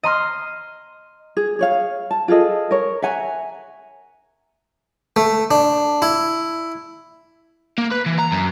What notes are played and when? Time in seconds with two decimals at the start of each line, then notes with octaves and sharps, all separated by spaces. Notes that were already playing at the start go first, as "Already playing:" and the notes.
0.03 D#5 A#5 C6 F6
1.37 G#4
1.59 G#4 C#5 F5
2.11 A5
2.28 F4 G#4 A4 D#5
2.71 A#4 C#5
3.02 E5 F#5 G#5 A#5
5.16 A3
5.51 D4
6.02 E4
7.78 A#3
7.91 B4
8.06 E3
8.19 A#5
8.32 F#2